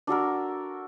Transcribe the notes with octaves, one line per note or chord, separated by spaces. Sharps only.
D4 F#4 A4 A#4